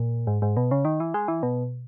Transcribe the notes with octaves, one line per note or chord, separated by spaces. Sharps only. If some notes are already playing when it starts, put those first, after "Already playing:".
Already playing: A#2
G#2
G#2
B2
C#3
D#3
E3
G#3
E3
B2